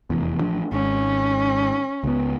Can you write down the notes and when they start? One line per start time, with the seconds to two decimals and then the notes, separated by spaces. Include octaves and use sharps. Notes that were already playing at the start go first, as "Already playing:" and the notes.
0.10 F1 E2
0.41 A1 F3 D4
0.72 G#1 C#4
2.04 C#2 B3